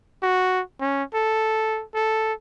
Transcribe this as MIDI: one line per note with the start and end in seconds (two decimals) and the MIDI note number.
0.22 0.61 66
0.80 1.03 61
1.14 1.84 69
1.94 2.33 69